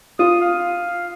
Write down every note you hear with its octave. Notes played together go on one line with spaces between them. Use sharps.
F4 D#6
F5